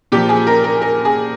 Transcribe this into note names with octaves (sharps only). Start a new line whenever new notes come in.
A#2 F3 G4
G#4
A#4
A#4
A#4
G#4